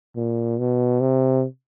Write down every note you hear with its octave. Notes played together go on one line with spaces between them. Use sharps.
A#2
B2
C3